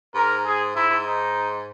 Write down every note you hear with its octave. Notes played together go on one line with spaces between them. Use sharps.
G#2 A#4
G#4
G#2 E4
G#2
D#4